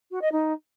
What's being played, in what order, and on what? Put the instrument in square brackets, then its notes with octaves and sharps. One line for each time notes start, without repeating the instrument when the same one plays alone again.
[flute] F#4
D#5
D#4